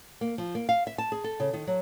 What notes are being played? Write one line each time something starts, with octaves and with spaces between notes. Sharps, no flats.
A#3
F3
A#3
F5
E5
A5
G#4
A4
C#3
D#3
F#3